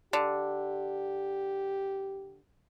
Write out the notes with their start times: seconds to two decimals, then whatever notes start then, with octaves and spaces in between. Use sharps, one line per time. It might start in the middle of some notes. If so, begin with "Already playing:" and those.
0.13 D3 G4